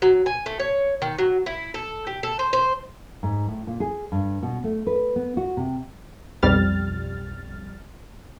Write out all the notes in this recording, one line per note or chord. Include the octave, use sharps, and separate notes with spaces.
F#3
G#5
A3
C#5
D#3
F#3
E4
A4
G4
A4
C5
C5
G#2
A2
A#2
G#4
G2
B2
A3
B4
B3
F#4
C3
B1 F2 G3 F6 A6